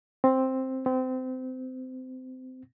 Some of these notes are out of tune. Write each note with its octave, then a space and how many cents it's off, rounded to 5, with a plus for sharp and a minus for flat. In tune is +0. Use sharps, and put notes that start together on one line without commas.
C4 +5
C4 -25